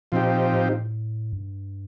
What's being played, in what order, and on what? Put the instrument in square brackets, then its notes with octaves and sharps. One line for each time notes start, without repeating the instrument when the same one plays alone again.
[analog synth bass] A#2 [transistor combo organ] F3 C4 D#4 G4
[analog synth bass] A2
G2